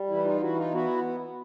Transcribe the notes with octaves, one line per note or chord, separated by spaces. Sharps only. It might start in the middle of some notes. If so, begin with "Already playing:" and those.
Already playing: G3
E3 E4
D#4 F4
E3 E4 F#4
D#4 F4
B3 E4 F#4